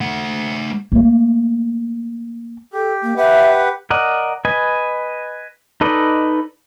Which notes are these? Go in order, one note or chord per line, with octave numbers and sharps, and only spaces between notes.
A3 F#5
A3 A#3
G4 A4
A#3
G4 B4 E5 F#5
A#4 D5 D#5 F#5
B4 D#5 G#5
D#4 A4 B4 D5 D#5